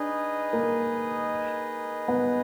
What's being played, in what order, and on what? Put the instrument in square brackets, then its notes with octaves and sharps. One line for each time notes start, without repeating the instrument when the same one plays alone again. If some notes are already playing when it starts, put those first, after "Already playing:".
Already playing: [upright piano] D4 [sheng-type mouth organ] D#4 G#4 B4 D#5
[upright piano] A#3
B3